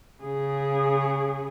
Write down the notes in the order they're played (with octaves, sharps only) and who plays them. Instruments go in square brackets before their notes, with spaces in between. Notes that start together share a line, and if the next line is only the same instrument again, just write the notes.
[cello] C#3 G#4